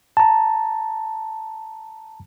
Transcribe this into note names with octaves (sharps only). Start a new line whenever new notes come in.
A5 A#5